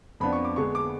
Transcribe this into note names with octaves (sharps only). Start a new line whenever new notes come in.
F2 F3 B3 D4 B5
C#6
D6
D3 G#3 B3 D4 C#6
D6